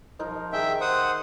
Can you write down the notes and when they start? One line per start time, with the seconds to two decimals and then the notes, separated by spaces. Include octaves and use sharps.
0.19 F3 D#4 A#4
0.52 D#3 G#4 E5 G5
0.81 C5 F#5 D#6